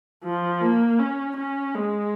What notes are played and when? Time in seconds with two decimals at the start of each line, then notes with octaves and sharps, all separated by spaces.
0.24 F3
0.62 A#3
0.99 C#4
1.37 C#4
1.74 G#3